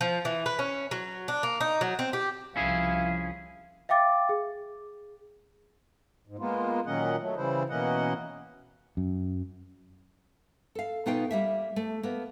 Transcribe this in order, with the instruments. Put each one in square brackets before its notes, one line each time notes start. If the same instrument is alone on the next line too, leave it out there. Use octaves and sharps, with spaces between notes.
[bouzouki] F3
E3
B4
C#4
F#3
D4
A#3
D#4
F#3
C4
G4
[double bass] C2 F3 [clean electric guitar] C#4 E4 G#4 [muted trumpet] F5
[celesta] E5 F5 G5 D6 A6
G#4
[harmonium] G#2
G#3 A#3 B3 F4
A#2 D#3 F#3 C#4 D#5 F#5
F#3 A3
C#3 E3 G3 E4 C5
B2 E3 A#3 C#4 D#5 F#5
[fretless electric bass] F#2
[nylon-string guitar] A4 F5
B2 B3 D#4 F4 F5 G5
G3 A#3 E5
A3
A#3 B3